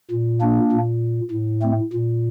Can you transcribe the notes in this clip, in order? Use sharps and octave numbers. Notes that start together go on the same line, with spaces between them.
A#2
A#3 D4
A#2
A2
A3 C4
A#2